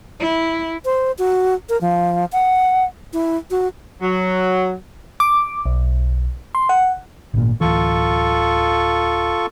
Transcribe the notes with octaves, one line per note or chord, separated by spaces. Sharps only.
E4
C5
F#4
A#4
F3
F#5
E4
F#4
F#3
D6
B1
C6
F#5
G#1 A#2
D1 E3 F4 A4 C#6